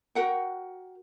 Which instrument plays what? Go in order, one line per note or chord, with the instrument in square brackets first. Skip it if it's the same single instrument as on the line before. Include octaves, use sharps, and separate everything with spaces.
[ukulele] F#4 A#4 F#5 G5